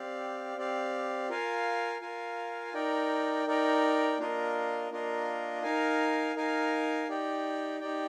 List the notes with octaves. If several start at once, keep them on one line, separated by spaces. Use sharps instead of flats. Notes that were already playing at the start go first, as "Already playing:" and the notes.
Already playing: C4 G4 D5 F5
C4 G4 D5 F5
F4 A#4 F5 G#5
F4 A#4 F5 G#5
D#4 A#4 D5 G5
D#4 A#4 D5 G5
A#3 D4 F4 A#4 D#5
A#3 D4 F4 A#4 D#5
D#4 A#4 F5 G#5
D#4 A#4 F5 G#5
D#4 G4 D5 G5
D#4 G4 D5 G5